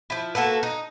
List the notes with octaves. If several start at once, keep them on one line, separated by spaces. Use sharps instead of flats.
F3 E4
A#3 F#4 A4 B4
D#4